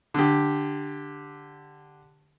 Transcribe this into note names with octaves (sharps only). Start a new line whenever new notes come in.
D3 G4